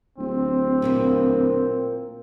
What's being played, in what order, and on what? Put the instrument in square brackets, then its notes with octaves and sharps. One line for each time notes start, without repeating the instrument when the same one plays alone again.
[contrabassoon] D1 [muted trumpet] C4
[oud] A#2 A#3 E4